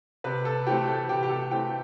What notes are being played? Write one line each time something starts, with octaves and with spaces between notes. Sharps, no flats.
C3 B4
A4
E3 A3 C4 G4
A4
C3 G4
G4
A4
E3 A3 C4 G5